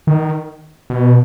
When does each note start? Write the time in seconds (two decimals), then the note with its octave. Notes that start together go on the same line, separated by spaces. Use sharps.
0.07 D#3
0.90 B2